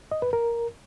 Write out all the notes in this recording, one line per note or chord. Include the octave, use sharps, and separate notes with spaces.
D#5
B4
A#4